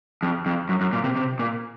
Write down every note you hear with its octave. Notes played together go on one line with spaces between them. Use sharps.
F2
F2
F#2
F#2
A#2
C3
C3
A#2